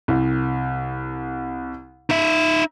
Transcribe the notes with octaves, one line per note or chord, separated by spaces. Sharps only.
C2
D#4 E5